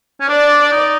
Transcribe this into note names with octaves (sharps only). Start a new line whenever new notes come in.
C#4
D4 D5
D#4